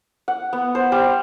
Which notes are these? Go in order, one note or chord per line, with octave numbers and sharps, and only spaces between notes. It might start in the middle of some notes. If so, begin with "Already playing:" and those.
F#5
B3
C5
G3